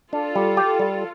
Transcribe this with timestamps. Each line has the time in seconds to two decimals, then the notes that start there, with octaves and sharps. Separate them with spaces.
0.12 D4 F4 A4
0.36 G3
0.57 G4
0.79 G3